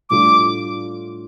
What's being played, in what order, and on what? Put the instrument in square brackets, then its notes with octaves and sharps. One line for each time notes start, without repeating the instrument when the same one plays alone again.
[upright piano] A2 G3 D4 F4 A4 [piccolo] D6